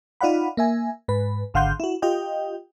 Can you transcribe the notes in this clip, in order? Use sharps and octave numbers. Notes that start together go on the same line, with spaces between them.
D#4 F4 D5 F5 F#5 B5
A#3 E5 G#5
G#2 B4
G#1 D3 F5 F#5 C6 G6
E4 F#4
F4 G4 D#5 G5